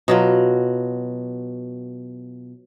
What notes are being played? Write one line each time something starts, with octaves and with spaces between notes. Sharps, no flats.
B2 F#3 F4